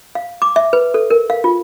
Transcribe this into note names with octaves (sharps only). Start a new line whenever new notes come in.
F5
D6
E5
B4
A4
A#4
F5
F4